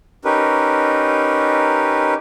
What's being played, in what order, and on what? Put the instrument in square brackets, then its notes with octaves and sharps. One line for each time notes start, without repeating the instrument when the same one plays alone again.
[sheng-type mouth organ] C#4 D#4 G4 A#4 B4